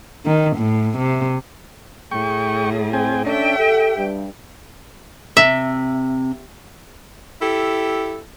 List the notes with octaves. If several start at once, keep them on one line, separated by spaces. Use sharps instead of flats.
D#3
A2
C3
A2 G#4 G5 C#6
C4 G5 G#5
C#4 D4 A4 E5 G5
G4 A4
G2
C3 E5
E4 G4 A4